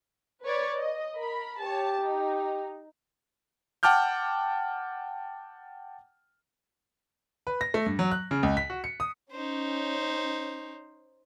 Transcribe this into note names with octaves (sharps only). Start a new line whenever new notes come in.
B4 C#5 D5
D#5
A#4 B5
G4 C#5 A5
D#4
F#5 G5 A5 D6 F6 G6
B4
A#6
A3
G2
F#3
F#6
C#3
C#2
B6
F#4
C#7
D#6
C#4 D#4 C5